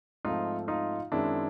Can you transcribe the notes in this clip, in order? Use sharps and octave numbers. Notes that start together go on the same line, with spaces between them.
G#2 F3 A3 C4 D#4 F4
D#4 F4
F#2 D#3 G#3 C4 D4 E4